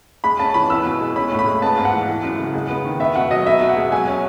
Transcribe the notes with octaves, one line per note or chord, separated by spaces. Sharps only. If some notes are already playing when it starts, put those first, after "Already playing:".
G#3 B5
C#4 A5
E3 B5
B3 E6
B2
G#3
C#4 B5
A2
B5
G#3
B3 A5
G#2
F#5
E3
E3
F#2
C#3
G#3
B3
D#3
B3 E5
B2 F#5
F#3 D#5
B3 E5
B2
F#5
G#3
F#3 G#5
C#4